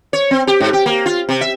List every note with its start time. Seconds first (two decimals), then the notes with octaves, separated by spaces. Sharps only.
0.13 C#5
0.31 C4
0.47 G4
0.60 G#2
0.73 G4
0.86 A#3
1.06 F4
1.29 C3
1.41 E5